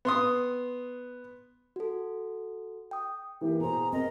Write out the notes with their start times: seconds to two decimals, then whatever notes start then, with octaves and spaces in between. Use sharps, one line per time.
0.05 B3 C6 D#6
1.76 F#4 A4
2.91 G5 D#6
3.41 E3 A#3 G4
3.60 B2 G#4 C5 A#5
3.93 C4 A#4 D#5